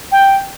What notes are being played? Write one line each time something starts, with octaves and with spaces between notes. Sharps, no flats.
G5